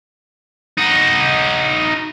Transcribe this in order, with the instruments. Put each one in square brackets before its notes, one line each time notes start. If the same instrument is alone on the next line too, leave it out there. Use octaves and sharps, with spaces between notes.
[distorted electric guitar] D#4 F#4